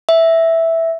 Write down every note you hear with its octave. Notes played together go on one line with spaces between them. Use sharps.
E5